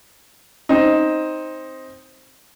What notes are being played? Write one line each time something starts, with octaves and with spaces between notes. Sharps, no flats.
C4 D#4